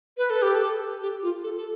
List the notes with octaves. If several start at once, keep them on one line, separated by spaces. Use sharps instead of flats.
B4
A4
G4
A4
G4
F4
A4
A4